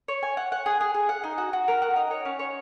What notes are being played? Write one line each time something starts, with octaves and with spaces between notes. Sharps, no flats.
C#5
G#5
F#5
F#5
G#4
G#4
G#4
F#5
D#4
F#4
F#4
A#4
F#4
D#4
C#5
C#4
C#5